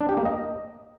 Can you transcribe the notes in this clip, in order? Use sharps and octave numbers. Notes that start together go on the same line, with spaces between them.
D4
G4
A#3
D#5